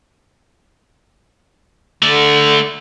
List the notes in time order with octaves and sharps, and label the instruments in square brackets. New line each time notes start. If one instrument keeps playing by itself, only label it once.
[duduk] D3 [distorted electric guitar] A3 D5